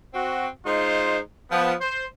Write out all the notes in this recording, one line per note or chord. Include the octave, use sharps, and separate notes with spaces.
C4 F#4
G#3 D#4 F4 C5
F3 B3
C5